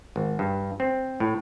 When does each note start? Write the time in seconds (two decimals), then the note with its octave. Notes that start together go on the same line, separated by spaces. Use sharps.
0.16 G#1
0.39 G2
0.80 C4
1.20 A2